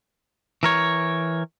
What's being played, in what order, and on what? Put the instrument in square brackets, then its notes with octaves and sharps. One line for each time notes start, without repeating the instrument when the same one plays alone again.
[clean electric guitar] E3 A#4 C#5